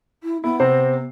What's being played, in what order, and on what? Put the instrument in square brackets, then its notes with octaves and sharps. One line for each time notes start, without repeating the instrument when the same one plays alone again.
[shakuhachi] E4
[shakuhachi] B3 [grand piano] E4
[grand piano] C3 C4 C5